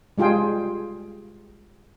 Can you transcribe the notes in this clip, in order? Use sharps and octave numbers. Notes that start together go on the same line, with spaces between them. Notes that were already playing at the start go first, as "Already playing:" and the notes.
G3 G#3 F4 G#4 G5